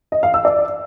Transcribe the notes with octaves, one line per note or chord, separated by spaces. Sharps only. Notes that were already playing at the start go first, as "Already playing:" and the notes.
D#5
F5
E6
D5